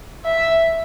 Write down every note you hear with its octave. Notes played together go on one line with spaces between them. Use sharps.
E5